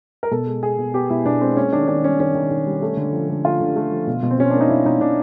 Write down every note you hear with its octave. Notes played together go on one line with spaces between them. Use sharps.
A#4
B2 A4
G#3
G#3 G#4
B2
B3 G4
B2 E4
B2 D4
G#3 C4
C4
A#3 C#4
D#3 D4
D#3 D4
G3 C#4
D#3 C#4
D#3
D#3
G3
A3
D3
F3
D3
A3 F4
D3
A3
F3
B2
B2
C4
B2 C#4
A#3 D4
D#4
B2 E4
B2 D#4
B2 D4